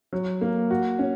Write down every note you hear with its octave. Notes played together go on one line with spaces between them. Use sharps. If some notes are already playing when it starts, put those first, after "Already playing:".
F#3
A#3
F#4
C#4